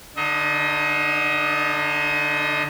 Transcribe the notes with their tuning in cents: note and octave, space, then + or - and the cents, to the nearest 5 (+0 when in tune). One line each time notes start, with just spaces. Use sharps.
D3 +0 D#4 -35 D#5 +35